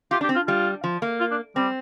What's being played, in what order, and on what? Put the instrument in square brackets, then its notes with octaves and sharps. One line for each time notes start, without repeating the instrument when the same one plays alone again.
[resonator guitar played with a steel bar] F4 [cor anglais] G4
[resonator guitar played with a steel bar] D4
[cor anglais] G4
[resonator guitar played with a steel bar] C4
[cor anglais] F4
[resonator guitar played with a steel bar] G3 [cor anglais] F4
[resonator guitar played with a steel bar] F3
A#3
[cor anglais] F4
D4
[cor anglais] G3 [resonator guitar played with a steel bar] C4